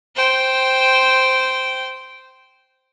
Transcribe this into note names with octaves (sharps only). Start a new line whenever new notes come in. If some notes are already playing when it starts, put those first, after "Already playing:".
C5 G5